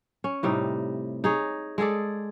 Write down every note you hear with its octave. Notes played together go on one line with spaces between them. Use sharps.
C#4
A2 C3 G3 D#4
D#4 G#4 C#5
G#3 G#4 A4 D5